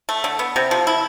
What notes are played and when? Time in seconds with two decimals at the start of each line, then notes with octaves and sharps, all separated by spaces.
0.09 A3
0.24 D3
0.39 B3
0.56 C3
0.71 F3
0.87 E4